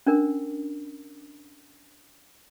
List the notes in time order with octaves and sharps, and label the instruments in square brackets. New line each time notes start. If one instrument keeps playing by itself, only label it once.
[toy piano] C#4 D4 A#4